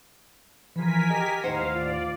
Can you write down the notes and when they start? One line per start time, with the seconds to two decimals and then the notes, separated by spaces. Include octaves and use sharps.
0.76 E3 F3 A#4 G#5 B6
1.10 G4 D#5
1.44 D#2 A2 D#4 C5 F5 F#5
1.73 F4 D5